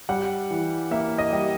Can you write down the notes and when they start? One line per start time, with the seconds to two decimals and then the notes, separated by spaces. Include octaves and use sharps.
0.09 G3 F#5
0.51 E3
0.91 A#3 E5
1.18 D#5
1.32 G3